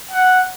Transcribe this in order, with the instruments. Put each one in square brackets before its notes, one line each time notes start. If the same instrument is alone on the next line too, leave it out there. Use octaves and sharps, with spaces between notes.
[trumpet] F#5